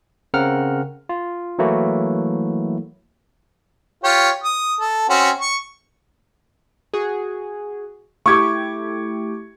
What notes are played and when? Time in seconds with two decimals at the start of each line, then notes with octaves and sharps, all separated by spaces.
0.34 C#3 C4 A#4 F#5 F6
1.09 F4
1.59 E3 F#3 A3 A#3 E4 F#4
4.04 F4 G4 C#5
4.44 D#6
4.80 A4
5.09 C4 C#4 F#4
5.41 C#6
6.94 F#4 G#4
8.26 A3 E4 G4 C#6 D6 G#6